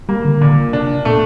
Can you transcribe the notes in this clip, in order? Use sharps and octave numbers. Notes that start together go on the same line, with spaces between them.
G3 A#3
D3
A#2 D3
C3 D4
A#2 A3